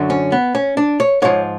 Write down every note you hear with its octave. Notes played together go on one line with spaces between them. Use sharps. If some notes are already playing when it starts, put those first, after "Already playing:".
Already playing: F#2 D3 F#3
C#4
B3
C#4
D4
C#5
G#2 F3 C#5